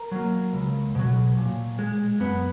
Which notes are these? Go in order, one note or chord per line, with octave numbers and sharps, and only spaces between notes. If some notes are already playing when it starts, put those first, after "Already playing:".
Already playing: A#4
F#3 A#3
C#2
B2 F#3
A#2
G#3
F#2 B3